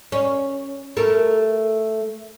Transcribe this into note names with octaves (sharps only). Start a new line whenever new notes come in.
C#4
A3 A#4